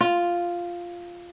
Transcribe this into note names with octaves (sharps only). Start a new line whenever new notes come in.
F4